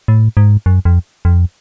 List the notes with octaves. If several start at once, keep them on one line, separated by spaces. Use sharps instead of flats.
A2
G#2
F#2
F2
F2